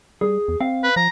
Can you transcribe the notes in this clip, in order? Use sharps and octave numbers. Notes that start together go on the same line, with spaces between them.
G3 G#4
E2
C4 F5
B4
F3 A#5